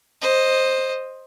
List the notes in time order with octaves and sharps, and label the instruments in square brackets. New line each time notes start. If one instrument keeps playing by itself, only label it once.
[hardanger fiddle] C5 D#5